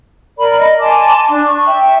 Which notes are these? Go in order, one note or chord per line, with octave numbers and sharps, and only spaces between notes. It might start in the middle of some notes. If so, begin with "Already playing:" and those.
A#4 D5 B5
D#5
G#5 A5 C6 D6
D4
C#6
E5 G5